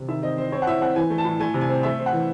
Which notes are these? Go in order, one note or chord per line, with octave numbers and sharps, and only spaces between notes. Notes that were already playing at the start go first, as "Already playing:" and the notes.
Already playing: C3
D#3 E5
C4 D#5
C4 C5
C4 C#5
F#5
A2 E5
C4 F#5
E3 G#5
A3
A5
A2
A3 G#5
C3
G#5
C4
A3 E5
C4
F#5
E3